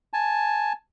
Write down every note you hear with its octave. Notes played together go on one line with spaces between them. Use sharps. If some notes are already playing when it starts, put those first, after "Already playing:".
G#5 A5